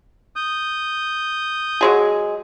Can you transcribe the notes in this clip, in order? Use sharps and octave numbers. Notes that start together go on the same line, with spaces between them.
D#6 G6
F#3 G#3 G#4